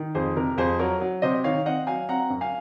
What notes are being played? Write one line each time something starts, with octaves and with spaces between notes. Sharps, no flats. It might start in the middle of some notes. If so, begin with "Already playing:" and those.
Already playing: D#3
F2 G#4 C5
C3 A#4
F2 G#4 C5
F#3 A#4 C#5
F#3
C3 C5 D#5
D#3 C#5 F5
C4 D#5 F#5
F#3 F5 G#5
C4 F#5 A#5
F#2
F5 G#5